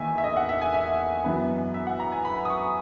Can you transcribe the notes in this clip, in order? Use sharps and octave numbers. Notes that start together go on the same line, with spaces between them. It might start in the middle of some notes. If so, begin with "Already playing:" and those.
Already playing: E2 D#3 A#3 E5 G#5
E5
D#5
F#5
E5
G#5
E5
F#2 E3 B3 B4
E5
F#5
A#5
G#5
B5
D#6
C#6